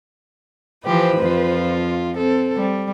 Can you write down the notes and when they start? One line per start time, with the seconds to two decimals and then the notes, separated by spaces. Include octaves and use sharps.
0.85 E3 F3 G4 B4 C5
1.18 F2 F3 F4
2.17 C4 A4
2.57 G3